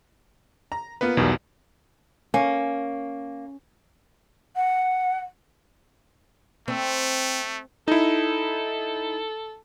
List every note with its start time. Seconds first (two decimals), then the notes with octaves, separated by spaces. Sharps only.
0.72 A#5
1.01 A#3 B3 F4 B4
1.17 B1 E2 B2 D#3 G3
2.34 A#3 C#4
4.56 F#5
6.68 A3 C4
7.88 D#4 E4 A4